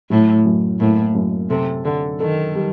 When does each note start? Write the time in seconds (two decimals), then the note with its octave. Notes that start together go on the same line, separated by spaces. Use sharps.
0.10 A2 F#3
0.46 F#2
0.80 A2 A#3
1.15 F#2
1.50 C3 A4
1.84 D3 A4
2.20 D#3 A4
2.55 G3